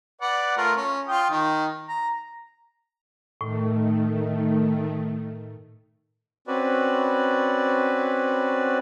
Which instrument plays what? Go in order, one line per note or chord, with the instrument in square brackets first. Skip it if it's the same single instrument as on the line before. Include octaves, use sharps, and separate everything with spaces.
[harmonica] B4 D5 F#5
A3 F4 A#4
C#4
F4 G5 D#6
D#3
A#5
[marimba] A2 [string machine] D#3 A3
[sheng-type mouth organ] C4 C#4 F#4 B4 D5